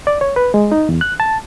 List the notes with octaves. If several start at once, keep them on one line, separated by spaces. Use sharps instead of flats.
D5
C#5
B4
G#3
D#4
E2
F#6
A5